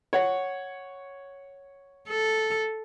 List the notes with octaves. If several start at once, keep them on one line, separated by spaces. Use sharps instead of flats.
C#5 F#5
A4